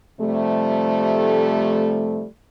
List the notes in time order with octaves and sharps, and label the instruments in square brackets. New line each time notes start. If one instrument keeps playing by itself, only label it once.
[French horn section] C3 F3 G3 A3